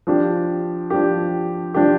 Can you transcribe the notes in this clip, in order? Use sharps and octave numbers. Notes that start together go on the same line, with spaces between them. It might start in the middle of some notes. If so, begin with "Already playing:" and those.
F3 D4 G4
F3 D4 G4
F3 D4 G4